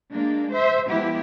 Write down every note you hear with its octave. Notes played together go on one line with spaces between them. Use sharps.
G#3 A#3 D4
C5 E5
F3 G#3 B3 E4 G4